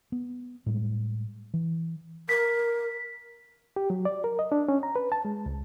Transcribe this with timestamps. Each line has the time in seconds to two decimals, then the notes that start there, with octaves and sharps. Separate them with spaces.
0.12 B3
0.66 A2 G3 G#3
1.54 E3
2.29 A#4 B6
3.76 G4
3.90 F#3
4.05 D5
4.24 A#4
4.39 D#5
4.52 D4
4.69 C#4
4.83 A#5
4.96 B4
5.12 A5
5.25 G#3
5.46 C#2